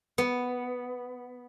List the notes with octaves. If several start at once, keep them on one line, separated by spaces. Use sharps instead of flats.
B3